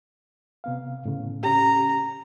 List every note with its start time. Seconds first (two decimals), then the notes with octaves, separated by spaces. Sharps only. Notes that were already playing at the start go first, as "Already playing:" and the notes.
0.64 C3 B3 F5
1.05 A2 C#3
1.43 C#4 G4 A#5